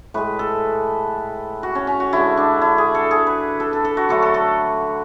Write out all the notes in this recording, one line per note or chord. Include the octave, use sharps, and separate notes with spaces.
A2 G#3 B4
A4
F#4
C#4
C#4
F#4
D3 G#3 E4
D4
E4
G#4
A4
G#4
B4
A4
A4
A4
F#4
D3 F#3 A3 A4
A4
A4